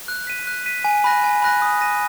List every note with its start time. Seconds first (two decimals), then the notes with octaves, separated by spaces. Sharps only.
0.08 F#6
0.27 B6 D#7
0.47 F#6
0.66 B6 D#7
0.84 G#5
1.04 B5 F#6 A#6
1.24 G#5
1.42 B5 F#6 A#6
1.62 D#6
1.81 A#6 D#7